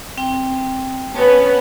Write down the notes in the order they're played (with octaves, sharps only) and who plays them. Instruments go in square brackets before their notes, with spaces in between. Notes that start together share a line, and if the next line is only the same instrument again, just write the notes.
[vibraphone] C4 G5
[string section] B3 C#4 [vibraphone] B4 C#5 A5